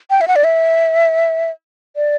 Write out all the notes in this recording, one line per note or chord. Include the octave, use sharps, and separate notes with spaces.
G5
E5
F#5
D5
E5
D5